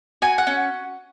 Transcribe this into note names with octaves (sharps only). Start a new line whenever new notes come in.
F#4 G#5
F#5
C#4